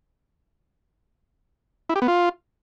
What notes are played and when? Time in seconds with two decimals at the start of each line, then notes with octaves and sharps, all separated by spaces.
1.89 E4
1.96 G4
2.02 B3
2.08 F4